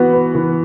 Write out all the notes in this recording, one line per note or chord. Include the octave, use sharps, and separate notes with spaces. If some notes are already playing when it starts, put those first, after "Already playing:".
Already playing: E3 B3 F#4
B4
E3